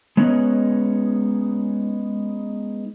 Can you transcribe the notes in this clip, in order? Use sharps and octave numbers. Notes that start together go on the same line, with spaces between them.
G#3 B3 C#4 D#4 B4 C#5